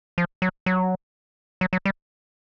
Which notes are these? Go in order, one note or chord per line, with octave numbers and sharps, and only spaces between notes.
F3
F#3
F#3
F#3
F#3
G3